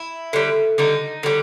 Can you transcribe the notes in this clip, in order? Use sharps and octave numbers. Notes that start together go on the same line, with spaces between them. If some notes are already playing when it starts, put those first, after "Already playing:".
Already playing: E4
D3 G3
D3 G3 D#4
D3 G3